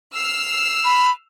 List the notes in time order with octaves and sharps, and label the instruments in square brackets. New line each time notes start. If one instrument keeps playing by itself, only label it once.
[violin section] E6 F6 C7
[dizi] B5